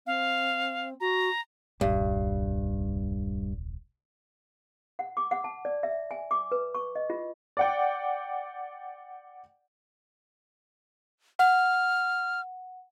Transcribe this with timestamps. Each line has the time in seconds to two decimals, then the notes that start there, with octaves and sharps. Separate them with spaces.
0.07 C4 F5
1.00 F#4 A#5
1.81 D#1 C2 G2
4.99 F#5
5.17 D6
5.31 F#5
5.44 A5
5.65 D5
5.83 E5
6.11 G#5
6.31 D6
6.52 B4
6.75 C#6
6.96 D#5
7.10 F4
7.57 D5 F#5 G5
11.39 F#5 F6